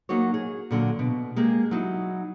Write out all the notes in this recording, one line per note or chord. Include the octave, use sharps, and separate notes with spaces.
F#3 A#3 D#4 F#4 C#5
G#4
A#2 D3 F#3
B2
G#3 A#3 G4 G#4
F#3 D#4 E4